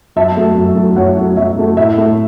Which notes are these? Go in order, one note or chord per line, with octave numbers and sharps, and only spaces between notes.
F#2 E5 A5
F#3 A3
F#2
F#3 A3
F#2 C#5 F#5
F#3 A3
F#2 E5
F#3 A3
A2 E5
A3